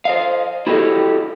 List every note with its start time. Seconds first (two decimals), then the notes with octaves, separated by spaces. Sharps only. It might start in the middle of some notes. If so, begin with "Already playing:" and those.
0.05 C5 D#5 F5
0.67 E4 F#4 G4 A4 D#5